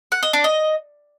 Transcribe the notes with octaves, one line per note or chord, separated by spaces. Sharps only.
F#5
D#5
D4
D#5